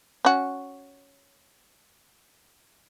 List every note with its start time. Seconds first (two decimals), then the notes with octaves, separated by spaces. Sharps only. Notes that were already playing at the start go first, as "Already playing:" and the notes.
0.25 C#4 F#4